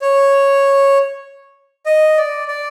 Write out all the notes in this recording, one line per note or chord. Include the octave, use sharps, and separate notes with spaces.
C#5
D#5
D5
D5